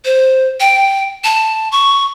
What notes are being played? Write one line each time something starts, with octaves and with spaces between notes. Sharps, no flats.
C5
G5
A5
C#6